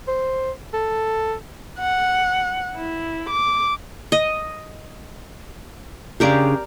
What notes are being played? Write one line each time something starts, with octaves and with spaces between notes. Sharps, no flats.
C5
A4
F#5
E4
D6
D#5
C#3 D4 G4 G#4 A#4 D5